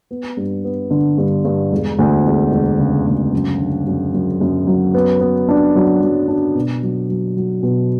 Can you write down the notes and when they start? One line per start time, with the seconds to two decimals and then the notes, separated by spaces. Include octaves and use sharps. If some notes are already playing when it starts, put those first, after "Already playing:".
0.11 B3
0.37 G2
0.64 B3
0.91 D3
1.18 G2
1.45 G2
1.72 E1
1.99 D2
2.26 E1
2.52 E1
2.79 C#3
3.07 D2
3.33 F#2
3.60 D3
3.87 F#2
4.14 F#2
4.41 F#2
4.67 F#3
4.94 B3
5.21 B3
5.49 D4
5.75 F#3
6.02 F#3
6.28 D4
6.55 B2
6.83 F#3
7.09 F#3
7.36 F#3
7.63 B2